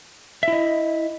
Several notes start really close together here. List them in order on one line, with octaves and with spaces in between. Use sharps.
E5 E4 D#5